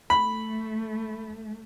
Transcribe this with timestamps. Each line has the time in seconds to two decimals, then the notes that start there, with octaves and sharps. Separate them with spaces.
0.10 A3 B5